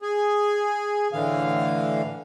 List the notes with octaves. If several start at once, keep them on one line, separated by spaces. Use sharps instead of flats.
G#4
A2 D3 E3 F5